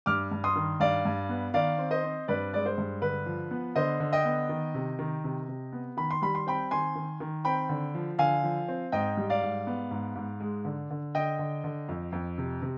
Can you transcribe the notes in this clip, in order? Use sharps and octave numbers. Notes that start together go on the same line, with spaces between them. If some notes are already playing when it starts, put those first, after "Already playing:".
G2 D6 F6
G2
C6 D#6
D#3
G2 D5 F5
G2
B3
D#3 D5 F5
C4
C5 D#5
C4
G2 B4 D5
G#3 D5
C5
G2
D3 B4
F3
B3
D3 C5 D#5
D3
D#5 G5
B3
D#3
C3
D#3
C3
C3
B3
D#3 B5
C6
G3 B5
C6
C4 G5 B5
D#3 G#5 C6
D#3
D#3
C4 G5 B5
D3
F3
D3 F5 G#5
F3
C4
G#2 D#5 G5
G3
D5 F5
G#2
B3
G#2
G#2
G#3
D3
D3
D3 D#5 G5
D3
D3
F2
F2
C3
C3